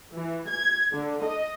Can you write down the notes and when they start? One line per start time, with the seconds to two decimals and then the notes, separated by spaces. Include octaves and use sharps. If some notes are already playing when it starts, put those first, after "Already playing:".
0.13 E3
0.49 G#6
0.93 D3
1.24 D#5